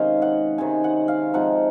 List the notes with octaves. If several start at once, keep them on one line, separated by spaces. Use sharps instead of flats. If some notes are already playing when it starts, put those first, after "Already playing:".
Already playing: C3 D#3 G#3 C#4 D#5 F5
F#5
C3 D#3 G#3 C#4 G#5
F#5
F5
C3 F3 G#3 D#4 F#5